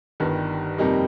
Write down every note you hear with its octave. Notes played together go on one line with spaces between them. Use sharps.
G1 G2 D#3 G3
F2 C3 G3 A#3 D#4